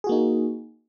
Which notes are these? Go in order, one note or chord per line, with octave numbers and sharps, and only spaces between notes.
A#3 D#4 F#4 G#4